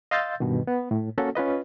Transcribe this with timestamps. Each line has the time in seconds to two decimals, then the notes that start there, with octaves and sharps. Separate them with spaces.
0.11 D#5 F5 C6 E6 G6 A6
0.40 G2 B2 D#3
0.67 B3
0.91 A2
1.18 A#3 C#4 F#4 A4
1.35 C#4 F4 B4 D#5